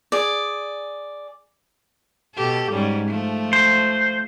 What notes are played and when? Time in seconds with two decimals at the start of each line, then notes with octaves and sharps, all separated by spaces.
0.12 G#4 D5
2.35 B2 G4 A4
2.72 G#2 G3 C#4
3.08 F3 A3
3.53 C5